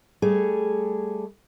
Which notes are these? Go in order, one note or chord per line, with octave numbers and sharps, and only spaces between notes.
G3 A3 G#4